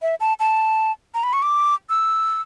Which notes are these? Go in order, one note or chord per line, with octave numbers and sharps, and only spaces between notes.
E5
A5
A5
A#5
B5
C#6
D6
E6